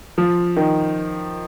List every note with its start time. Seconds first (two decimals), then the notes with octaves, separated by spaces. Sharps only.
0.18 F3
0.57 D#3